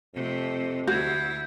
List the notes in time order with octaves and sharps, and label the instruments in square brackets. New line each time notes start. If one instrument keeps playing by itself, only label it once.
[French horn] F2 [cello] C3 A3
[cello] D2 E4 [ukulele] F#4 [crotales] G6 G#6